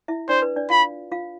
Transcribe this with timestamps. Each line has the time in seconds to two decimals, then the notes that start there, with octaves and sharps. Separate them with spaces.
0.08 E4 E5
0.28 D4 C5 D5
0.42 B4
0.56 D4 D5
0.70 F4 F5 B5
1.11 F4 F5